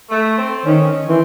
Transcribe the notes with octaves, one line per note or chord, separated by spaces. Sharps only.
A3
C4
D#3 C#4
E3 C4